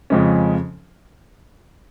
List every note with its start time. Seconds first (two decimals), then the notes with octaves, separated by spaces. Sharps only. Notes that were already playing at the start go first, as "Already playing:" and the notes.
0.10 F2 C#3 G#3 C#4